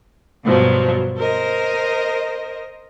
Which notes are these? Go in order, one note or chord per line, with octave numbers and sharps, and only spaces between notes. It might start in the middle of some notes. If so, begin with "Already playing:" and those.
G2 B2 F3 F#3
A#4 C5 D#5